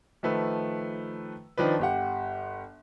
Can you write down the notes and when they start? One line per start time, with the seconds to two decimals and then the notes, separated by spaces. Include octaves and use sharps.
0.23 D#3 F3 A3 B4 E6
1.58 D#3 F3 D4 B4
1.79 G1 G4 F#5